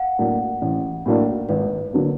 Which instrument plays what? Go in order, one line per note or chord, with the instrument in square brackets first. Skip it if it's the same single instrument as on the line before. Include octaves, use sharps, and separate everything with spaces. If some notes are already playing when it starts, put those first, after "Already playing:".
Already playing: [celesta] F5 F#5
[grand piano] A2 F#3 A#3 D4
A1
A2 F#3 A#3 D4
[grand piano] G#1 [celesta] B4
[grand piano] D3 F#3 A#3